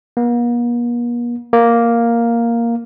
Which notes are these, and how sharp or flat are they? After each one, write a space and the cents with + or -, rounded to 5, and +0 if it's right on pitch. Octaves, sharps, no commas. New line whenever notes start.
A#3 +45
A#3 +0